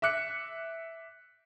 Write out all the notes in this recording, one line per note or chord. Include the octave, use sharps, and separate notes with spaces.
E5 D6 F#6 C#7